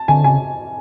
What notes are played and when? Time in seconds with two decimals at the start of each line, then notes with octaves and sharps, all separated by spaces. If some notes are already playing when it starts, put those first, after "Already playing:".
Already playing: A5
0.08 D3 G#5
0.24 C#3 G#5